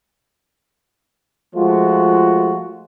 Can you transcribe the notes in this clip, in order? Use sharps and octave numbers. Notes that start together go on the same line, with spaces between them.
F3 G#3 A3 F4 F#4